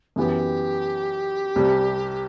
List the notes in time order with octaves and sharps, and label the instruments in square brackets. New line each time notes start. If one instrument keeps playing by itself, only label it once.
[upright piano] F#2 E3 B3 [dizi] G4
[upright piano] C2 C3 G3